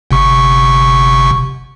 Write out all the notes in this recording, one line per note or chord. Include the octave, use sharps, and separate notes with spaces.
G1 C3 C#6